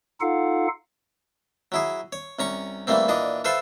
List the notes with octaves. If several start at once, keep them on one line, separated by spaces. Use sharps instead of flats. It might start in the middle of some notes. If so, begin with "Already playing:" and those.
D#4 F4 A4 F5 F#5
F#3 E4 G#4
C#5
C2 C#4 A#5 C#6
E3 G3 A3 A#3 C4
A#2 E3 D4 D#5
F4 A4 B4 C5 E5 C6